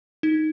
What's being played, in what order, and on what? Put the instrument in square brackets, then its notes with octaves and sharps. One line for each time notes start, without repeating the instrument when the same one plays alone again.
[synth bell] D#4